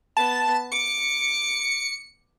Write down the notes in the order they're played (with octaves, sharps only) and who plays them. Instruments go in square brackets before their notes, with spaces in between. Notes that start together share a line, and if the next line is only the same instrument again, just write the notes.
[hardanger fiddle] B3 [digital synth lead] A5
[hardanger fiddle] D6 [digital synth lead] C#7